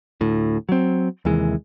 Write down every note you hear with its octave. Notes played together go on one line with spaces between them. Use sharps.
D2 A2
F#3 C4
D#2 C3 E3 G#3